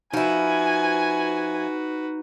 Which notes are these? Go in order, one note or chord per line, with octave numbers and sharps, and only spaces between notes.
F3 D#4 E4 F#4 B4 G#5